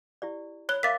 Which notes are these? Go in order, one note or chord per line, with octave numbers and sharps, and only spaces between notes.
E4 G4 D5
C#5 B5 F#6 G7
A#4 E5 F5 D6 A6 B6